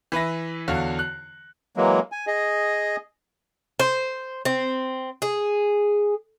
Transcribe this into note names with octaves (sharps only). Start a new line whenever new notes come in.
E3 B4 E5 A#6
E2 D3 F#4 C#5 F5
F#6
E3 F#3 G#3 A#3
G#5
G#4 D#5
C5
C4
G#4